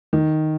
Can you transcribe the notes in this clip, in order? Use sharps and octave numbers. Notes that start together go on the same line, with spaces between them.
D#3